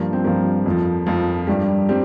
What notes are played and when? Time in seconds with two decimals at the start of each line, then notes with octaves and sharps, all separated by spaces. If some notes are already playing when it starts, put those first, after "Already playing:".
Already playing: G2 F3 A#3
0.13 C4
0.24 G2 F3 A#3
0.66 F2 F3
1.07 F2 F3
1.47 G2 G3
1.89 G3 C4